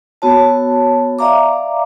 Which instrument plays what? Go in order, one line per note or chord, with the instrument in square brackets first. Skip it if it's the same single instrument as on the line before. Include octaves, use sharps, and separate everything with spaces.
[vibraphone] B3 F#4 C#5 A5
D5 E5 F5 A#5 D6